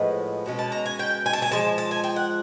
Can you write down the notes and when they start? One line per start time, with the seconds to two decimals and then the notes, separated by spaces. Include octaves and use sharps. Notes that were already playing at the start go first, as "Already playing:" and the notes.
Already playing: A2 F3 G#3 B3
0.46 B2 G#3 C#4
0.59 A5
0.72 A#5
0.86 G#5
0.99 G5
1.26 G#5
1.33 A5
1.42 G#5
1.51 F3 G#3 A5
1.78 A5
1.91 G#5
2.04 G5
2.16 F#5